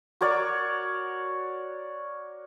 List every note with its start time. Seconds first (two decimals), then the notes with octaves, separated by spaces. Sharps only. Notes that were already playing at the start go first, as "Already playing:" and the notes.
0.21 F#4 A#4 C#5 D5